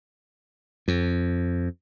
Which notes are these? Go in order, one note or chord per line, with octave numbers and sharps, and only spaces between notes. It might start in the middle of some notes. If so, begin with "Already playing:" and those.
F2